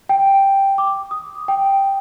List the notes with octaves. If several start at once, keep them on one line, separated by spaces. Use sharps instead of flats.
G5
D6
D#6
G5